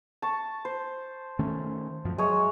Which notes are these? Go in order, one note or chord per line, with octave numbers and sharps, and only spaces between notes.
A5 C#6
C5
D#3 A3 C#4
F#2 F3
F#3 G#3 C#5 E5